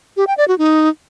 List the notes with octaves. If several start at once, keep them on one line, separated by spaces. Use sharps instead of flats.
G4
G5
D5
F#4
D#4